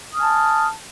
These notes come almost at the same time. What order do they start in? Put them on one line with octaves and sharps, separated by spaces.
D#6 F6 G#5 A5